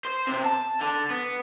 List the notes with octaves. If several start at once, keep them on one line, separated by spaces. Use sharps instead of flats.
C5
C3
A5
D3
B3